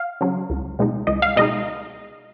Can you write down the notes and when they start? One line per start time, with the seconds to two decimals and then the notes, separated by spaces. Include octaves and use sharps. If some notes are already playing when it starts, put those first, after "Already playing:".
Already playing: F5
0.21 C#3 F#3
0.50 C#2
0.79 B2 G#3 D#4
1.07 C#2 D#5
1.22 F5
1.36 B2 G#3 D#4 D#5